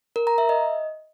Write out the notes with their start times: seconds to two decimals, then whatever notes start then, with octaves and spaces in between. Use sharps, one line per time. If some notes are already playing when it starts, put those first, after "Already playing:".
0.16 A#4
0.27 A#5
0.38 E5
0.49 D#5